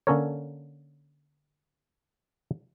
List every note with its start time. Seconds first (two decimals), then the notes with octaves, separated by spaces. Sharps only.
0.07 D3 A#3 C#4 A4 A#4 C#5